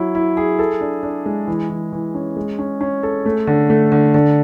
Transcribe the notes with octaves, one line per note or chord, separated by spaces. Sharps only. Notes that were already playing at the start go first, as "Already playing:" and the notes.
Already playing: F#3 E4
E4
G#4
A4
D4
D4
G#3
E3
E3
E3
C#4
G#3
C#4
C#4
A4
A3
D3
A3
D3
D3